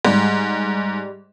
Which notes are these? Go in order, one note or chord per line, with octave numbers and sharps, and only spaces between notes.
G#2 G3